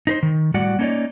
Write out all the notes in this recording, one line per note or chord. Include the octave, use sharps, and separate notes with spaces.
D#4 B4 C5
D#3
A2 G3 F#4 D5 F#5
A#3 C#4 D#4 A4 C#5 D5